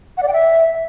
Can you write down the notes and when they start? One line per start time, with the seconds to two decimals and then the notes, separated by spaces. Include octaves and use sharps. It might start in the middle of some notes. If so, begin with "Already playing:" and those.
0.17 F#5
0.23 D5
0.28 G5
0.33 E5